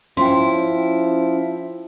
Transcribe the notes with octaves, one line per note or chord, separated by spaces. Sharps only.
F3 C#4 E4 G5 C6